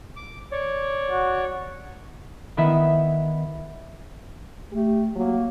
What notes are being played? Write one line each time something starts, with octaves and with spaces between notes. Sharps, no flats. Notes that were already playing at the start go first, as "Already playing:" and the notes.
D6
C#5 D5
F#4
D#3 B3 E4 E5
A3 G4
F#3 A#3